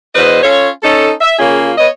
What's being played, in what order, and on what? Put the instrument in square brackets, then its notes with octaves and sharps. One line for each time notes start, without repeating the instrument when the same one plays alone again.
[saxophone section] E2 B2 B4 C5 D#5
C#4 F4 A4 C#5
C#4 D#4 A4
E5
C#3 A#3 C#4 F4 G#4
B3 C#5 D#5